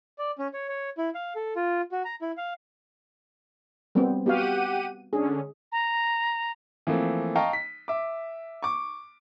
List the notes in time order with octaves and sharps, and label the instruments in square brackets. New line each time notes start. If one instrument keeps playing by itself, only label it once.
[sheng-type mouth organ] D5
C#4
C#5
C#5
E4
F5
A4
F4
F#4
A#5
E4
F5
[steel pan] G3 B3 C4
[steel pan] B3 F#4 F5 [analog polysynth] G4 F#5 D#7
[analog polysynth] D3 C#4 [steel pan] G#4
[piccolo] A#5
[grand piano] E3 F3 A3 A#3 C4
D#5 F5 G5 A5 A#5 C#6
B6
E5 D6
C#6 D6